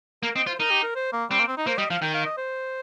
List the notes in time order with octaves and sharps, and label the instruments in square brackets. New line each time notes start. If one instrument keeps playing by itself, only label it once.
[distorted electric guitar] A#3 [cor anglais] A#4
[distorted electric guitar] C4 [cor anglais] D#5
[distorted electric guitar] F4 [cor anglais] C5
[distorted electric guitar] D#4 [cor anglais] A#4
[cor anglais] G4
A#4
C5
A#3
[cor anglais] G3 [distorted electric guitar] C4
[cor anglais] A#3
C4
D#4
[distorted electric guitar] A#3 [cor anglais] C5
[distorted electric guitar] G3 [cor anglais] D#5
[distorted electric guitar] F3 [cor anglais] F5
[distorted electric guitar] D#3 [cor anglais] G5
[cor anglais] F5
D#5
C5